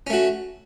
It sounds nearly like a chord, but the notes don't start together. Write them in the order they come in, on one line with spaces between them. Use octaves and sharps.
C#4 A3 F#4